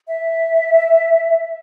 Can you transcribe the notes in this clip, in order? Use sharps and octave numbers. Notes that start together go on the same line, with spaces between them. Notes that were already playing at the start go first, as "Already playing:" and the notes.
E5